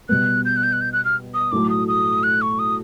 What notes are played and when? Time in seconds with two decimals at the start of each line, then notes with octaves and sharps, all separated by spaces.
0.09 B2 G3 B3 F#6
0.45 G6
0.57 F#6
0.63 G6
0.73 F#6
0.81 G6
0.93 F#6
1.05 F6
1.34 D#6
1.52 A2 F#3 A3 D6
1.70 D#6
1.88 D#6
2.23 F#6
2.42 C#6
2.59 D#6